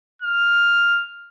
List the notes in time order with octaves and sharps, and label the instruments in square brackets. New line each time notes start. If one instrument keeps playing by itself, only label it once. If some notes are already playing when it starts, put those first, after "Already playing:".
[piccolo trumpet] F6